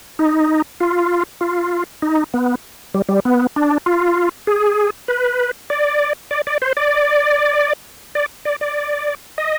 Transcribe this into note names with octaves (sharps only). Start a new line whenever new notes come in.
D#4
F4
F4
D#4
B3
G3
G3
B3
D4
F4
G#4
B4
D5
D5
D5
C5
D5
D5
D5
D5
D#5